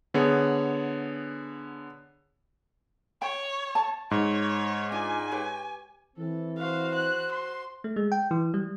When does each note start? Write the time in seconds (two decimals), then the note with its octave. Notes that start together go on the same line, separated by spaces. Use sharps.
0.14 D3 B3 G#4 C#5
3.22 C#5 G5
3.75 A5
4.11 G#2 C#5
4.92 D4 D#4 F4 G#5
5.31 G4 B4 C#5
6.17 E3 C4 A4
6.58 F#4 C5 F5
6.95 F#6
7.31 C6
7.84 A3
7.96 G#3
8.12 G5
8.31 E3
8.54 G3